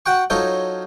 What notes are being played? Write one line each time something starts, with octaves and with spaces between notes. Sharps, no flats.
F#4 F#5 G5 C#6
F#3 D#4 F4 A4 C5 C#5